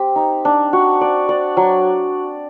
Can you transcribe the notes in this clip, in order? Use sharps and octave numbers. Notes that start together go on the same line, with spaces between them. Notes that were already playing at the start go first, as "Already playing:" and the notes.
Already playing: C4 G4
D#4
D4
F#4
D5
D5
F#3